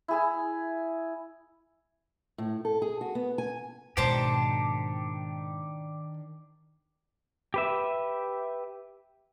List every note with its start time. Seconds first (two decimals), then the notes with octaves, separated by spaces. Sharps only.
0.08 E4 G#4 G#5
2.38 A2
2.65 A4
2.82 G#4
3.01 F#4
3.15 B3
3.38 G#5
3.97 G#2 B2 D#3 D4 G4 C5 A5 A#5
7.54 G4 B4 E5